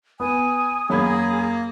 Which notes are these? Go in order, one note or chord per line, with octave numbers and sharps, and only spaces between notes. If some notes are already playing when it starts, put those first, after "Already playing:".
B3 G#5 D#6
F#2 A#3 G#4 B5 G#6